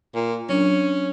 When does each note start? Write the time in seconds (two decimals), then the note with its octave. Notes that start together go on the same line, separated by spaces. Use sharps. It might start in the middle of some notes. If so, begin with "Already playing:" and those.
0.15 A#2
0.49 F#3 C#4 D4